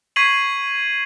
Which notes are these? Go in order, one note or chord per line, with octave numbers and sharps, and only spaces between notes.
C#6 G#6 B6 C7 D#7 F#7